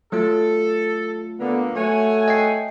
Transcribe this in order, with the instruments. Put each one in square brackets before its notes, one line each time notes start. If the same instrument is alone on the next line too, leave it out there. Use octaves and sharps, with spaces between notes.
[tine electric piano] F#3 A3 F4 [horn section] A4
[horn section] D3 A#3 [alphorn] B3
[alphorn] A3 [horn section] F#4 C#5 G#5
[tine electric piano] D#5 G5 C7